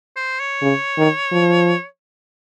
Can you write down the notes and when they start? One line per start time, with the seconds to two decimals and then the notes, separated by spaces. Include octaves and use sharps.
0.16 C5
0.40 C#5
0.62 C#3
0.98 D#3
1.32 F3